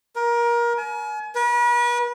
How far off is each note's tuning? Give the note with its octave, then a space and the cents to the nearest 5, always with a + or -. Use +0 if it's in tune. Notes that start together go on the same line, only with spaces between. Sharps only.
A#4 +25
G#5 +35
B4 -40